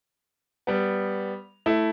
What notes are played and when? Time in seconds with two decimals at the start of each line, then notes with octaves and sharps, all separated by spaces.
0.67 G3 B3
1.66 A3 E4